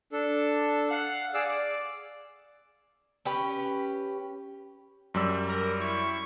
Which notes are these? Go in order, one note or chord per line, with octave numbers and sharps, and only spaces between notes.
D4 A4
F5 F#5 F#6
G#4 D5 F5 E6
D5
C#4 G4 B4
F#2 G3 E6
A#4
E4 C#6